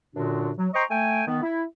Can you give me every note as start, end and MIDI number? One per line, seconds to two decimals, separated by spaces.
0.15 0.51 42
0.15 0.51 46
0.15 0.51 50
0.15 0.51 62
0.15 0.51 66
0.57 0.68 54
0.74 0.84 72
0.74 0.84 75
0.74 0.84 79
0.74 0.84 82
0.74 0.84 84
0.74 0.84 85
0.90 1.22 57
0.90 1.22 79
0.90 1.22 80
1.27 1.38 51
1.27 1.38 59
1.42 1.63 64